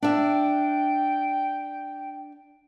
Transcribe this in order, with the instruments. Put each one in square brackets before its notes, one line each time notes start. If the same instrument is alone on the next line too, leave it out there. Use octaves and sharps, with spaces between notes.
[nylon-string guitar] D4 E5 [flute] G5